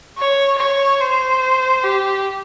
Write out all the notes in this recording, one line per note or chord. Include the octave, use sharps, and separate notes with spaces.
C#5
C#5
C5
G4